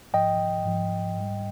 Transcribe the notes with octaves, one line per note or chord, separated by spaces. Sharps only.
G#2 F3 D#5 G5
G#2 F3
G#2 G3